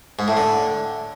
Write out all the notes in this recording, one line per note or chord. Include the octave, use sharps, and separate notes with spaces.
G#2
A2
D3